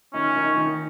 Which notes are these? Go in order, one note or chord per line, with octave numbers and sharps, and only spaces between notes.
D#3 C#4 D#4
D#3 D#4
D#3 D#4